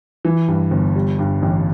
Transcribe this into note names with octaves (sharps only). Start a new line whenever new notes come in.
E3
G2
G1
G3
G2
A1